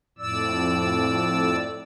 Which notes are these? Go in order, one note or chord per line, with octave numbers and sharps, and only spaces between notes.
F2 A2 D5 E6